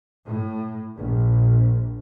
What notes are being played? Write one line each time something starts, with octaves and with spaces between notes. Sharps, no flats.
A2
A#1